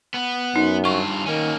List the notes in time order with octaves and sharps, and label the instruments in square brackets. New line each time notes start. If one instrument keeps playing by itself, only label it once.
[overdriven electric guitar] B3
[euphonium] F#2 [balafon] D#4
[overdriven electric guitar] G2 F4 [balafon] C#6
[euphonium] D#3 [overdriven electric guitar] A#3 C#4